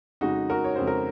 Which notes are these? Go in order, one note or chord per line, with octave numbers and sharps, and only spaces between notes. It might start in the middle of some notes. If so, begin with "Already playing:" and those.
F2 C#3 G#3 D#4 F#4
F#4 A#4
C#5
F2 C#3 G#3 C5
A#4